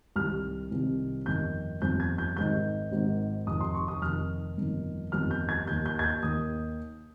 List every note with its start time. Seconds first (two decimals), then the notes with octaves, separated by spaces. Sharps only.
0.16 C2 C3 D#3 F6
0.71 C2 C3 D#3
1.26 G1 F2 D#3 G6
1.82 G1 F2 D#3 G6
2.00 G#6
2.18 G6
2.37 G#1 G#2 D#3 G6
2.92 G#1 G#2 D#3
3.47 F1 F2 D#3 D#6
3.61 C6
3.74 C#6
3.88 D#6
4.02 F1 F2 D#3 F6
4.57 G1 F2 D#3
5.12 G1 F2 D#3 F6
5.31 G6
5.49 G#6
5.67 D#2 D#3 G6
5.86 G6
5.99 G#6
6.04 G6
6.22 D#2 D#3 D#6